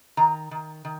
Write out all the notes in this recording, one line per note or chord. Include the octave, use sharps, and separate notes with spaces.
D#3 A#5
D#3
D#3